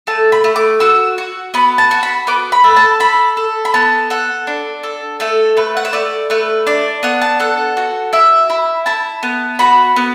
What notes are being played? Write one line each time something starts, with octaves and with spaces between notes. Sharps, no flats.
A3 A5
B5
A3
D6
F#4 E6
F#4
B3 B5
A5
F#4
B5
B3 D6
B5
A4
A5
A4 B5
A4
B5
B3 A5
A4 F#5
D4
A4
A3 A4
A3 B4
F#5
E5
A3 D5
A3 B4
D4 D5
B3 F#5
A5
A4 F#5
F#4
E4 E5
E4
E4 A5
B3
F#4 B5
B3